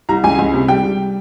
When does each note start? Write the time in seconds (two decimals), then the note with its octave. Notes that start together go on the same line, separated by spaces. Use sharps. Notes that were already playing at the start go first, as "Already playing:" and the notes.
0.09 C2 A#5
0.24 C#2 G#5
0.39 C#2
0.54 C3
0.68 G3 G5
0.83 G3